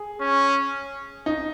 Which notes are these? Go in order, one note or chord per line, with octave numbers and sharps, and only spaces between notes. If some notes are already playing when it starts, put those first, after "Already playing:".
Already playing: G#4
C#4
D#4